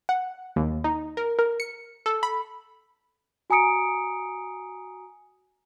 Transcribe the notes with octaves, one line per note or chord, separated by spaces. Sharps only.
F#5
D#2
D#4
A#4
A#4
C#7
A4
B5
F#4 G#5 A#5 D#6 C#7 D7